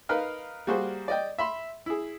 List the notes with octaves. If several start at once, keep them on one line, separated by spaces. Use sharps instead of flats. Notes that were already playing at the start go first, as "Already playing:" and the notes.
D#4 A#4 B4 F5 F6
G3 A#3 F#4 G#4 C5
D5 D#5 G5
E5 B5 C6
E4 G#4